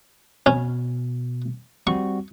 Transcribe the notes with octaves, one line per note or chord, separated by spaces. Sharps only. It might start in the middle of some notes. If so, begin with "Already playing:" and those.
B2 C#4
G3 C4 F#4 C#6